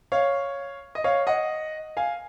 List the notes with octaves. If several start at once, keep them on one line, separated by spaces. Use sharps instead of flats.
C#5 F5
D#5
C#5 F5
D#5 F#5
F5 G#5